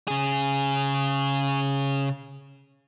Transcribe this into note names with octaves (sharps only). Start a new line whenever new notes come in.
C#3 G#4